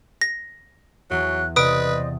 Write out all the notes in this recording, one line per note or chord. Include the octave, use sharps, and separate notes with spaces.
A#6
E2 F#3 C#6 F#6
C3 B4 C5 D5 D#5 D#6 D7